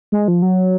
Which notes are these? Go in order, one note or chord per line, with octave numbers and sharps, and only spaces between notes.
G#3
F3
F#3